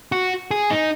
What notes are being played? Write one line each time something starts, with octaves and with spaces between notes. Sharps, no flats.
F#4
G#4
D#4